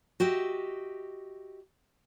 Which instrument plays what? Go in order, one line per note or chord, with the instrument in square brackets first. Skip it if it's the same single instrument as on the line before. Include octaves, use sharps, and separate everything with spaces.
[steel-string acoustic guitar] F#4 G4 D#5 E5